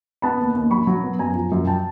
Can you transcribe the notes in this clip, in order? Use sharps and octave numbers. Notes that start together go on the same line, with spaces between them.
B3 A5 B5
D#2
D#2
F#3 B5 C#6
F#3
B3
F#2 G#5 A#5
F3
F#2
G5 A5